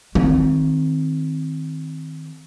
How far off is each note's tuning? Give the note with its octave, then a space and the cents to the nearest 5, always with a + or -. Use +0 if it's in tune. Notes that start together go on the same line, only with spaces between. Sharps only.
D#3 +10 C4 +0